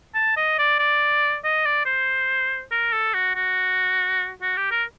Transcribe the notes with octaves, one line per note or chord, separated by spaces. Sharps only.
A5
D#5
D5
D5
D#5
D5
C5
A#4
A4
F#4
F#4
F#4
G4
A#4